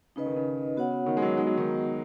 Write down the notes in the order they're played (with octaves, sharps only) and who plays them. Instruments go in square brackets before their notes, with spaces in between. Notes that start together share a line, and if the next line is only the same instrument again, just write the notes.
[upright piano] C#3 [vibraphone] D#4 B4 D#5
[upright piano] D#3
C#3
[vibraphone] B3 F#4 C#5 F#5
[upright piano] D#3
G#3
F#3
[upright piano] G#3 [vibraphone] B3 D#4 F#4 D#5
[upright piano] F#3
D#3